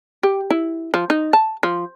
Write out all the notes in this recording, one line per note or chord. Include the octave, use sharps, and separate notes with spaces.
G4
E4
F3
D#4
A5
F3